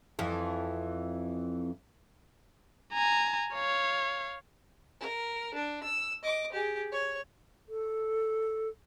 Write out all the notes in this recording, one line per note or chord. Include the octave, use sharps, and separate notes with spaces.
F2 E3
G#5 A#5
C#5 F5
A#4
D4
E6
D#5 D6
G4 G#4
C#5
A4